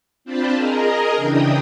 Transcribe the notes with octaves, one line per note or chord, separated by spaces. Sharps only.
C4 D4 F4 C5 A5 B5
G#4 A#4 D#5 A#5
C#3 E3 D4 G5 D#6